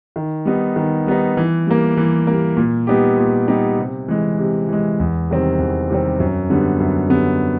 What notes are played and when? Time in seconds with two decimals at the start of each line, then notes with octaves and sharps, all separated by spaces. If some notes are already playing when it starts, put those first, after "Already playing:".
0.16 D#3
0.45 G3 B3 D#4
0.76 D#3
1.07 G3 B3 D#4
1.37 E3
1.67 G3 A#3
1.97 E3
2.27 G3 A#3
2.57 A#2
2.87 G3 B3 D#4 G4
3.18 A#2
3.48 G3 B3 D#4 G4
3.79 C3
4.08 E3 G#3
4.39 C3
4.68 E3 G#3
5.00 E2
5.30 C3 D#3 G3 C4
5.59 E2
5.90 C3 D#3 G3 C4
6.20 F#2
6.50 D3 G3 B3
6.80 F#2
7.10 D3 G3 B3